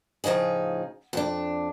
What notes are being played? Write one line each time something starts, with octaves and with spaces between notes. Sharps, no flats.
A2 C#3 F3 D#4 G#4
F2 D4